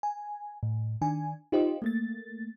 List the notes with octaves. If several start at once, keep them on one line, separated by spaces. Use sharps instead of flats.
G#5
A2
D#3 D4 G#5
D#4 F4 G4 C5 D#5
A3 A#3 A6